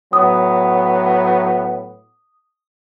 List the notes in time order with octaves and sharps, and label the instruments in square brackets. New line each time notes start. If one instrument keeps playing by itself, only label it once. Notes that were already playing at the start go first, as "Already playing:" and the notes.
[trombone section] A2 F#3 B3 [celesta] D#6